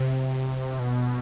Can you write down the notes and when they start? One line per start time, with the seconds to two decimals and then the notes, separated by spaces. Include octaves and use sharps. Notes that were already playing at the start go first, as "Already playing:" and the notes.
Already playing: C3
0.79 B2